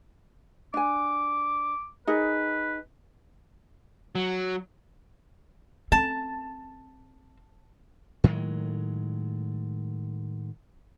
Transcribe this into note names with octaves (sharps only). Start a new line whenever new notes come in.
D4 G#5 D6
D#4 G#4 A#4 B4
F#3
C4 A5
A2 D#3 F#3 G#3